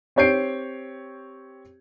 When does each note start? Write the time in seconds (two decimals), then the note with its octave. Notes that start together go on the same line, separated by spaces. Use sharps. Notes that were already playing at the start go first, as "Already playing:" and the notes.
0.16 C4 G4 C#5 G6 C7 D7